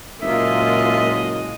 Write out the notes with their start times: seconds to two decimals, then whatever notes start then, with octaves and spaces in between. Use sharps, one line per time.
0.22 F#1 A#2 G#3 A#3 F4 D#5 E5